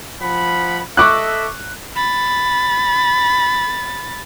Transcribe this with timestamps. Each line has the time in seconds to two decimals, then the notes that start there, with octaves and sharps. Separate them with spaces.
0.22 F3 F#5 B5
0.97 A4 D#5 E5 C#6 D6 F#6
1.96 B5 A6